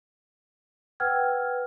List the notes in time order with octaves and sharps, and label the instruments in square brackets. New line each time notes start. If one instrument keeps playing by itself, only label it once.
[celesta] B4 F#5 G5 E6 F6 G#6